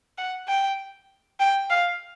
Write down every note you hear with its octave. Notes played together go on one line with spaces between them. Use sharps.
F#5
G5
G5
F5